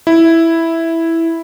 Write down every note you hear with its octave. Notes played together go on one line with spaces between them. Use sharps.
E4